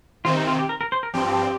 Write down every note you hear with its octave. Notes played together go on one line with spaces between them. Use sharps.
C3 D#3 C4 F4
D#4
F4
G4
A#4
A#4
C5
A#4
G2 F3 C4 G4